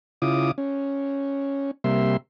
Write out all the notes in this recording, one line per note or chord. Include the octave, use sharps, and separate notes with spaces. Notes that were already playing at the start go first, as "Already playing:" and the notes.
C#3 E4 F4 D6 D#6
C#4
C3 G3 A#3 E5 C6